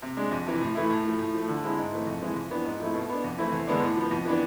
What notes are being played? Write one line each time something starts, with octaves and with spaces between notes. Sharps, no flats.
C3
G#3 D4
F2
C3 E3
A2
E3 A3 E4
A2
F3 A3
A2
F3 A3
D3
G#3 C4 E4
G#2
E3 A3 C4
F2
E3 G#3 C4 E4
F2
E3 B3 D4
G#2
F3 A3 C4 E4
B2
B3 D4
F2
E3 A3 C4 E4
E2
D3 G#3 B3 D4
A2
F3 B3
F2
E3 B3 D4